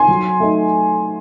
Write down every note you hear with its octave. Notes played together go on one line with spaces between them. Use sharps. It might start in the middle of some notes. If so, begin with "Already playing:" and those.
Already playing: G#5 C6
F#3
A3 D#4